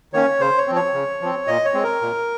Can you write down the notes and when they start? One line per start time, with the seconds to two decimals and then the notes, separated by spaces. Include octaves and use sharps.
0.13 D#3 A#3 C#4 C#5
0.40 C#3 C5
0.57 C#5
0.67 F3 C4
0.75 C#5
0.94 C#3
1.21 F3 C4
1.47 A#2 D#5
1.65 C#5
1.74 G#3 C4
1.83 A#4
2.01 A#2